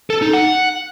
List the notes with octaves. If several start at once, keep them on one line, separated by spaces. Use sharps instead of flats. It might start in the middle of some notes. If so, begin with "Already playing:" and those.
A4
D#4
F#5